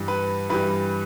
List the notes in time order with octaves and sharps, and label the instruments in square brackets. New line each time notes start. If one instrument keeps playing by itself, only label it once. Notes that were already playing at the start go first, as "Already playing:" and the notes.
Already playing: [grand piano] G2 E3 G3
[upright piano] B4
[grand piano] G2 E3 G3 [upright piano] B4